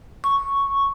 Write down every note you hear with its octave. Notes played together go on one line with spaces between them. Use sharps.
C#6